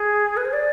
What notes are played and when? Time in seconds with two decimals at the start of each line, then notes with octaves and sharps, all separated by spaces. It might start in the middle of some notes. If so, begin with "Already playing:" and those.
Already playing: G#4
0.37 B4
0.45 C5
0.53 D5